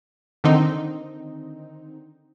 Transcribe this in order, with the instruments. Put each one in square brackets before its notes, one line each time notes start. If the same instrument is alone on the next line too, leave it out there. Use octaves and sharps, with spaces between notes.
[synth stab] D3 D#3 C4 D#4